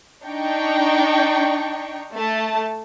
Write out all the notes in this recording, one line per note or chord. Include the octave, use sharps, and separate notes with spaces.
D4 D#4 G5 C#6
A3 A5